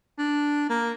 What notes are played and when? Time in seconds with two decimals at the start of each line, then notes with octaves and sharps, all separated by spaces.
0.18 D4
0.69 A#3